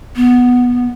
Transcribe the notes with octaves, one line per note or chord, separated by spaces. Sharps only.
B3